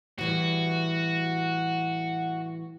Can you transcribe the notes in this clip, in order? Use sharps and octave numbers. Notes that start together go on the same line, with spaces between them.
A2 E3 G3 F#4